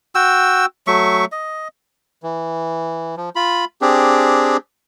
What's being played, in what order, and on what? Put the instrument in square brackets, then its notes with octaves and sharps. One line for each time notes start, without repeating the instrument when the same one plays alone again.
[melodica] F#4 G5 E6
F#3 A3 E5 C#6
D#5
[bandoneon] E3
F3
F4 B5
C4 D4 G4 G#4